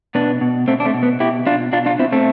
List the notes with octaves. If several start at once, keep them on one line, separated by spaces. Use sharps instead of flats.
B2 B3 D4
B2
B2 A3 C4
D4
A3 C4
B2
B3
B2 E4 G4
B2 D4 F4
B2 D4 F4
D4 F4
B2 C4 E4
A3 C4